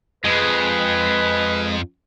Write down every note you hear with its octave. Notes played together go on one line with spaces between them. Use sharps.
F2 G#3 B4